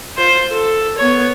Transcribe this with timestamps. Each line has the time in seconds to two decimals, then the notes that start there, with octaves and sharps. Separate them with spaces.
0.17 F4 C5
0.51 A4
0.98 B3 C#5